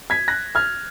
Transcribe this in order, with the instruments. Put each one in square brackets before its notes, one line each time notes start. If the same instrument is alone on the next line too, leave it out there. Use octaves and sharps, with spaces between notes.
[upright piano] G#6 B6
F#6 A#6
F6 G#6